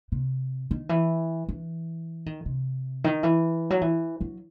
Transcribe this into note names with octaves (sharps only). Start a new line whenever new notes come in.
C3
D#3
E3
E3
D#3
C3
D#3
E3
F#3
E3
F#3